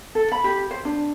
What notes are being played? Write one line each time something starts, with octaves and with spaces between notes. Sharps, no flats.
A4
B5
G4
C5
D4